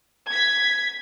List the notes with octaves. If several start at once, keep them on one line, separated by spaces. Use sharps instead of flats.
G#6 B6